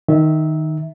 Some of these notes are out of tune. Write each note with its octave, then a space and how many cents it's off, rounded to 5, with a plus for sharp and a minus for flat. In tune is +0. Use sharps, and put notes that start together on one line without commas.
D#3 +0 E5 -15